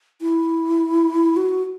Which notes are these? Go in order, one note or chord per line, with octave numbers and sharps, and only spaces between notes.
E4
F#4